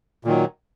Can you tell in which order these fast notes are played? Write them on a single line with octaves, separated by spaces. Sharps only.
A#2 D#3 F#3